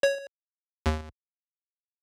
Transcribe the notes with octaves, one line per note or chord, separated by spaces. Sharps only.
C#5
D#2